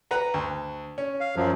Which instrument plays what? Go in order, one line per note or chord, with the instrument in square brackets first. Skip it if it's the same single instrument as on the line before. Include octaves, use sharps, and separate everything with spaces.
[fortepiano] B4 F#5 A#5
D2
C#4
[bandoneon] F5
F#2 F3 F#3